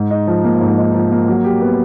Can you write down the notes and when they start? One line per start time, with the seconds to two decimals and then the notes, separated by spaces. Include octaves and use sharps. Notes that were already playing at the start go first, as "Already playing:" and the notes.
Already playing: G#2
0.11 D#4
0.27 F3
0.44 A#3
0.61 G#2
0.78 D#4
0.95 F3
1.12 A#3
1.28 F#3
1.44 G4
1.61 B3